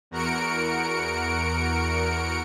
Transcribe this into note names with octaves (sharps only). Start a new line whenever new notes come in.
E2 F#4 A#4 C#7 D7